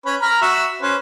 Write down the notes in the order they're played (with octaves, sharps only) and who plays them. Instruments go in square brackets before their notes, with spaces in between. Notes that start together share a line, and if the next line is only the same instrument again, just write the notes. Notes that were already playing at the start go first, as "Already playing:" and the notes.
[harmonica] C#4 B4 B5
A#5 B5 F6
F#4 E5
C#4 B4 C5